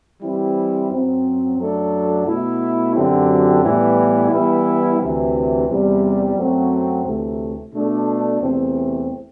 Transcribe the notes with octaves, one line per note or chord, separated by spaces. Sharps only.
E3 G3 C4 E4 G4
F#2 F#3 C4
F#2 F#3 A3 D4 A4
B2 A3 E4
F#2 D3 F#3 C4 G4
A2 E3 G3 B3 E4
E3 G3 B3 E4
D2 C3 E3
E2 C3 G3
F#2 F#3 A3 C4 F#4
D2 C3 E3 A3
B2 A3 D4 A4
E2 C3 E3 A3 C4